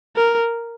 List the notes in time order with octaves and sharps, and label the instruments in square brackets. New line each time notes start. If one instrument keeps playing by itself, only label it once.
[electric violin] A#4